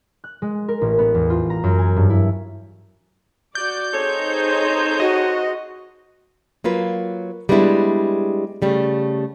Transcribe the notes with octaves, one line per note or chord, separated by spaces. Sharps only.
F#6
G#3
A#4
A1
B3
E2
F4
A#5
F#2
G#5
G2
E4
F#4 D5 G6
C4 D#4 G#4 A4 C5 C#5
F#4 D#5
F#3 A#3 F4 B4
G3 G#3 B3 D4 E4
C#3 G3 A3